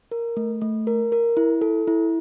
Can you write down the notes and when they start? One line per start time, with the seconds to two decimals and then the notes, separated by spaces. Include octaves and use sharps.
0.11 A#4
0.37 A3
0.62 A3
0.87 A#4
1.12 A#4
1.37 E4
1.61 A4
1.87 E4